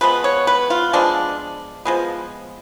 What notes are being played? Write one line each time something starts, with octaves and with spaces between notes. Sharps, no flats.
F3 G#3 B3 B4
C#5
B4
F4
F3 G#3 B3 D4
F3 G#3 B3